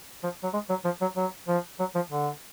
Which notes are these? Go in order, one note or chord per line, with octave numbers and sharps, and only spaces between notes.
F3
F#3
G#3
F#3
F3
F#3
F#3
F3
F#3
F3
D3